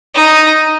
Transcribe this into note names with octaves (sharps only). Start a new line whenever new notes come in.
D#4